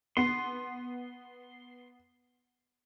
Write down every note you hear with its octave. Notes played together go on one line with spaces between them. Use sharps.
B3 C6